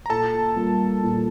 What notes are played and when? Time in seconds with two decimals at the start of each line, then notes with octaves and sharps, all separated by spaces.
0.06 A#5
0.10 A#2 A4 A5
0.56 G3 A#3 F4
1.03 A#2